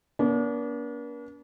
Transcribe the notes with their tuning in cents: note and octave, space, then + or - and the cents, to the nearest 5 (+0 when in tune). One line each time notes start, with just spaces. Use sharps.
A#3 +45 D4 -40